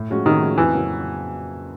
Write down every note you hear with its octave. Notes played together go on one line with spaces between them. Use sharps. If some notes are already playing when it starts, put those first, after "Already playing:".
Already playing: A2
F3 G#3 C#4 F#4
A2 D#3
F3 G#3 C#4 F#4
F2 E3
C#3 F#3 A#3